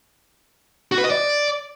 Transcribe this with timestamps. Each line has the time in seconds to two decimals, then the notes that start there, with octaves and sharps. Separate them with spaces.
0.92 F#4
0.98 B4
1.04 D#5
1.10 D5